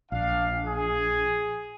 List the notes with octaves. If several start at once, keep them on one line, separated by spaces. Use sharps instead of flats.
A#1 D4 F5
G#4